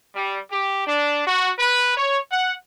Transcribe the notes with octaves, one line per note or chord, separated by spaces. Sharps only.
G3
G4
D4
F#4
B4
C#5
F#5